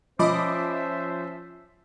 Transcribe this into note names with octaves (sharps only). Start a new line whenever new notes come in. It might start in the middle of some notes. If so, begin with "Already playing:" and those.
F3 C#4 C5 D#5 E5 B5 D6